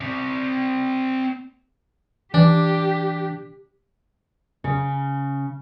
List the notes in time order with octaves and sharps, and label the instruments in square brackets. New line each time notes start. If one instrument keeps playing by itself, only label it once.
[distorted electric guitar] C4 D5
[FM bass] E3 [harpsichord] D4 [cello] G4
[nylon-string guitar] C#3